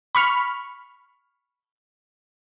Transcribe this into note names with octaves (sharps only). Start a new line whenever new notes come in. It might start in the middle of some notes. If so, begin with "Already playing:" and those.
B5 C#6 F6